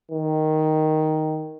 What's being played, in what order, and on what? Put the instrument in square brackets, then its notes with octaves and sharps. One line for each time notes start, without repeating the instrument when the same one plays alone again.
[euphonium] D#3